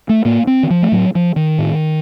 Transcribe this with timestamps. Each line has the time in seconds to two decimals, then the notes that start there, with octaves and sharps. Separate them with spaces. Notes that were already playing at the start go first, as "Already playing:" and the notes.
0.09 A3
0.25 A2 A#3
0.47 C4
0.63 D#3
0.70 F3
0.82 A3
0.92 A2 F#3
1.15 F3
1.36 D#3
1.59 A2